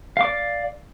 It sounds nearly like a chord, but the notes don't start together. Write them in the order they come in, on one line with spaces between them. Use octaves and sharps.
F5 D6 D5